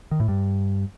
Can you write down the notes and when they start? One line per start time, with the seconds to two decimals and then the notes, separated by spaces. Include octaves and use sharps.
0.11 D#3
0.20 A2
0.28 G2